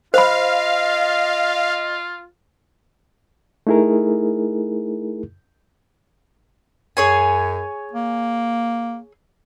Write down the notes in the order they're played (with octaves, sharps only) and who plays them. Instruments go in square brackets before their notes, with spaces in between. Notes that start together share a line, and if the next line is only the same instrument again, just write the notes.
[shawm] F4 [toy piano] C5 B5 [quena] D#5 [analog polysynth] F5
[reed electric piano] A3 D#4 E4 G#4 A#4
[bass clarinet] F#2 [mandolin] G#4 C#5 G#5
[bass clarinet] A#3